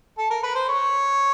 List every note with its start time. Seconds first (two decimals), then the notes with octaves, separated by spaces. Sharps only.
0.18 A4
0.30 A#4
0.43 B4
0.55 C5
0.68 C#5